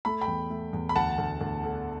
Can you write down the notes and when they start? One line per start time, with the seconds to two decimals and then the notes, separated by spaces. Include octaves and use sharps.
0.05 A3 B5
0.21 G5 B5
0.28 E2
0.50 A3
0.73 E2
0.89 B5
0.95 D2 F#5 A5
1.18 D2
1.41 D2
1.64 D3